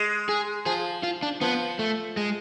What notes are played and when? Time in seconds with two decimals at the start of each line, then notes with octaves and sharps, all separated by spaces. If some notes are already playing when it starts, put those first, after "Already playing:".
Already playing: G#3
0.29 G#4
0.66 F3 G#4
1.03 F4
1.23 D4
1.41 F3 B3
1.79 A3
2.17 G#3